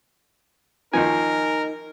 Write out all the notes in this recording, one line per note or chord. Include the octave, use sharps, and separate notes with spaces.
D#2 F3 D#4 A#4 G#5